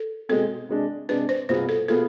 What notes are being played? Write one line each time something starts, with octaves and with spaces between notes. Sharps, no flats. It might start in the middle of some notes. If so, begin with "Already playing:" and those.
Already playing: A4
B2 G#3 C4 A4
C3 G#3 D4
C3 G#3 D4 B4
C5
C2 B2 B3 F4 G#4 C5
A4
B2 B3 F4 G#4 A4